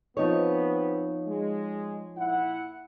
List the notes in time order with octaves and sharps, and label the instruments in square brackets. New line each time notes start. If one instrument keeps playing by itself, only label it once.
[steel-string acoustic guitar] F3 D#4 C#5 [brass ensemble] B3 C4
[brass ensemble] G#3
A#2 E4 F#5